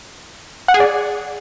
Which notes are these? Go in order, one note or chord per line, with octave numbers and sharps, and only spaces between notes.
F#5
G#4
D5